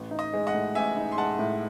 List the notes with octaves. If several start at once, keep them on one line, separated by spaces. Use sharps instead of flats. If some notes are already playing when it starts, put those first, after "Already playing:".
Already playing: A1
D#4
D#5
G#3
D#5 F#5
A2
A1 E5 G#5
D#4
C6
G#3 F#5 A5
A2